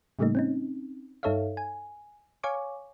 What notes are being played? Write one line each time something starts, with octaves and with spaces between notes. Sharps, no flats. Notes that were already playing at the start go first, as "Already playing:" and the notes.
A2 C#3 G3 A3 A#3 D#4
C4 C#4 D#4
G2 D#4 A4 C#5 E5 F5
G#5
C#5 F5 G#5 C#6 D6